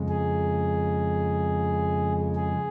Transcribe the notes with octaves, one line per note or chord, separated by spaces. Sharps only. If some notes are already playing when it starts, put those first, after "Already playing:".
Already playing: F2 C#3 G#3
G#4
G#4